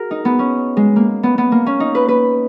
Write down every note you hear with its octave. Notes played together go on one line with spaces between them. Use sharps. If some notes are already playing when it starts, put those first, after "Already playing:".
Already playing: F#4 G#4 A#4
D#4
B3
C#4
G#3
A#3
B3
B3
A#3
C#4
D#4
B4
B4